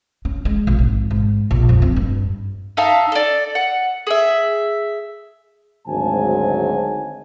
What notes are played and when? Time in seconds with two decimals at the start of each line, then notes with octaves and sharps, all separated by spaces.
0.25 C#4
0.45 G#3
0.67 A#1
0.79 G#1
1.11 G#2
1.51 A#1
1.69 F2
1.82 C4
1.96 G2
2.77 D#4 E5 F5 A5
3.12 A4 D5
3.55 F#5
4.07 G#4 E5
5.87 G#1 D2 G#2 F#3 G#5 A5